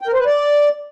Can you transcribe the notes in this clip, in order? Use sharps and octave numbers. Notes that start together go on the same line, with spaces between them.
G5
A#4
C5
B4
D5